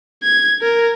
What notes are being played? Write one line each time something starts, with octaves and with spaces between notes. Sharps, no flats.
G#6
A#4